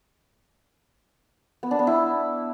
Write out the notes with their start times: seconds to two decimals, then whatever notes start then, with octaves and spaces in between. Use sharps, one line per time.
1.63 B3
1.71 D4
1.79 B3
1.87 E4